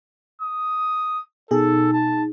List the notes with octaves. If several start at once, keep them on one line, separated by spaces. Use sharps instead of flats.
D#6
B2 D#4 G#4 A4
A5